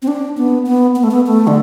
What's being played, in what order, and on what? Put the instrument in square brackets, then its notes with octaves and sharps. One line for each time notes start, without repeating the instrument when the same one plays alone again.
[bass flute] C4
D4
B3
B3
B3
A3
B3
A3
D3